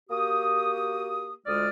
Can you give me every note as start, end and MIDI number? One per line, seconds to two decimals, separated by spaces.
0.10 1.33 58
0.10 1.33 66
0.10 1.33 67
0.10 1.33 87
1.46 1.69 38
1.46 1.69 56
1.46 1.69 65
1.46 1.69 74
1.46 1.69 87
1.46 1.69 89